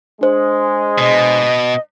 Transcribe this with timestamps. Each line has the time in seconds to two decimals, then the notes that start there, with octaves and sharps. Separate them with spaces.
0.21 G#3 D4 C5
0.99 B2 D#5